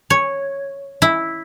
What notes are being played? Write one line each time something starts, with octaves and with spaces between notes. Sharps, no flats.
C#5
E4